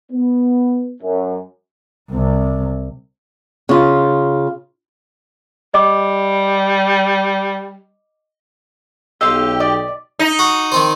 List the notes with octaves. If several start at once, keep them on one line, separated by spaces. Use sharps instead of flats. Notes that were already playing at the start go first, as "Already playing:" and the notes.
B3
F#2
C2 C3
C#3 F4
G3 D#5 D6
B1 G4 D#5 F5 C6 E6
D5 D#5
D#4
F#4
D#3 C4 C5